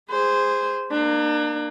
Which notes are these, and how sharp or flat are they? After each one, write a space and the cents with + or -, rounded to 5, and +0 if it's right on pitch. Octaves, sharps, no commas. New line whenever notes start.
G#4 -20 C5 -10
A#3 +0 D4 +35